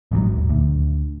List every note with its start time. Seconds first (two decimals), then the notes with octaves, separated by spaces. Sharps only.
0.11 A1 G#2 C#3 F#3
0.34 D#1
0.49 D2